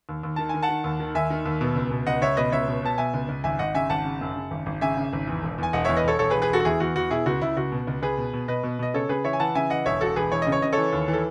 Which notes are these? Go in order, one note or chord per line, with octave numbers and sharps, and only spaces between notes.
D#2
D#2
D#3 A5
D#3 G#5
F#5 A5
D#3
D#2
D#3
D#2 E5 G#5
D#3
D#2
B2
C#2
B2
C#2 D#5 F#5
C#2 C#5 E5
B2 B4 D#5
C#2 C#5 E5
B2
B2 A5
B2 E5 G#5
C#2
C#2
G#1 E5 G#5
G#1 D#5 F#5
C#3 E5 G#5
G#1 F#5 A5
C#3
F#2
C#3
G#1
G#1
C#3 E5 G#5
C#3
G#1
E2
E1
E2 G#5
E1 D#5 F#5
E2 C#5 E5
B4 D#5
E1 A4 C#5
E1 A4 C#5
G#4 B4
E1
G#4 B4
E1 F#4 A4
F#4
E2 E4 G#4
E2 F#4
E2 F#4
B2 E4 G#4
C#2 F#4
C#2 E4
C#2 F#4
B2
C#2
C#2 G#4 B4
B2
B2
B2 B4 D#5
B2
B2 D#5
C#3 A4 C#5
C#3 G#4 B4
E3 C#5 E5
G#5
E3 F#5 A5
C#3 E5 G#5
E3 D#5 F#5
E1 C#5 E5
E1 F#4 A4
E1 G#4 B4
E3 C#5
C#3 D#5
C#5
C#3 D#5
E3 A4 C#5
D#2
E3
A4